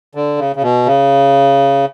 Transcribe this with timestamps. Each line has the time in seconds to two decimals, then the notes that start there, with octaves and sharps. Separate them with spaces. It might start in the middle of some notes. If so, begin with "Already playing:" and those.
0.15 D3
0.39 C#3
0.56 C#3
0.63 B2
0.86 C#3